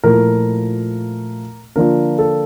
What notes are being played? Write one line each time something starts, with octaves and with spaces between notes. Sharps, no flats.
A#2 F3 A3 E4 A#4
D3 F3 A#3 D4 F4 A#4
A4